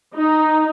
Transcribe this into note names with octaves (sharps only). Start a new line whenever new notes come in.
D#4